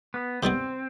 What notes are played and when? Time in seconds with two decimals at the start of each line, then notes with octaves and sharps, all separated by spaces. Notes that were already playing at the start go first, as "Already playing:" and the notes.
0.14 B3
0.43 C3 D#3 G3 B3 C4